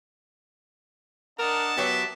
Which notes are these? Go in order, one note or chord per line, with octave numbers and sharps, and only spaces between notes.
D4 A#4 D#5 F#5 A5
F#3 B3 G4 E5